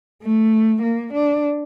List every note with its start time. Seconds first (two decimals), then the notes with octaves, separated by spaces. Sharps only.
0.22 A3
0.82 A#3
1.14 D4